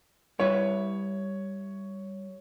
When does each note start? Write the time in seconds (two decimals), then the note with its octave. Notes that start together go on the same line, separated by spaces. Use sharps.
0.39 G3 E4 B4 C#5